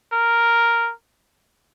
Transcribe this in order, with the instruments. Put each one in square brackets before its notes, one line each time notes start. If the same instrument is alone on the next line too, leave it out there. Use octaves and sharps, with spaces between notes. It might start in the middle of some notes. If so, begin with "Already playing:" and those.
[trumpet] A#4